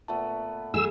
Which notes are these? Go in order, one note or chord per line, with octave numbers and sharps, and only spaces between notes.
A#2 A3 B3 A5
F#3 A3 G#4 E6